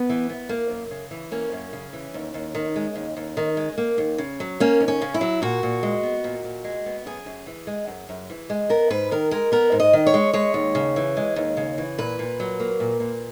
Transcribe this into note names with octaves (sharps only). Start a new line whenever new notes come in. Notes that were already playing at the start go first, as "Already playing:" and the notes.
Already playing: B3
E3
B3
A#3
F#2
C#3
E3
A#3 C#4
F#2
C#3
E3
D#2
D#2
D#3
G#3
D#2
D#2
D#3
G#3
A#3
D#2
C#3
F#3
A#3 C#4
D#2
C#4
C#3
E4
F#3
A#2 F#4
A#2
G#3
B3
A#2
A#2
G#3
B3
F#2 G#4
F#2
E3
G#3
F#2
F#2
E3
G#3
B3 A#4
G#2 B4
D#3 A#4
G#3 A#4
B3 A#4
G#2
D#5
D#3
C#5
G#3
G#3 C#5
D#2
C#3
E3
G#3
D#2
C#3
E3
A#2 B4
A#2
F#3
A#3
A#2
A#2